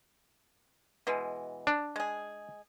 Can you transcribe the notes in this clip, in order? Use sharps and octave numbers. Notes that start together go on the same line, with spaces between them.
B2 E3 G#3
D4
G#3 G#4